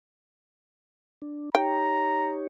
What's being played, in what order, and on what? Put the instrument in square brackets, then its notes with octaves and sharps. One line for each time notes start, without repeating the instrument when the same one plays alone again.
[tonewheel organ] D4
[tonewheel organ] D#4 G4 C#5 [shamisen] G5 [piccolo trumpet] A#5